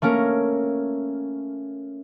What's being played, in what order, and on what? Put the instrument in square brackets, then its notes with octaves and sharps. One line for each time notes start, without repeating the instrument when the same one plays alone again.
[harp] A3 A#3 C#4 A#4